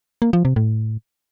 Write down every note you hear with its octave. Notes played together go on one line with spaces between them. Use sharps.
A#3
F3
C3
A2